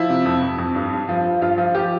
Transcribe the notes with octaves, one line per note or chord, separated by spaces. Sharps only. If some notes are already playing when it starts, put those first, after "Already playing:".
Already playing: F3 E4
C3
F2
F2
F2
G2
G2
F3
F3
G2 F4
F3
F3 G4